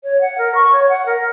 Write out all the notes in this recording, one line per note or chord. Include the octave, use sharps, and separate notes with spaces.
C#5
F#5
A#4
C#6
C#5
F#5
A#4